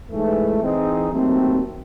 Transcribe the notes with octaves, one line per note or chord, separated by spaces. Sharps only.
G#2 E3 A3
E3 C4 D#4 G#4
D#2 D#3 F#3 A3 C4